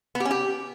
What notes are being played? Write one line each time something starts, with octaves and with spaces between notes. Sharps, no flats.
B3
G4
C#4
G4